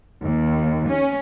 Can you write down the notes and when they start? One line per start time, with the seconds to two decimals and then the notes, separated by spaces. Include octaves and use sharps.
0.23 D#2
0.89 C#4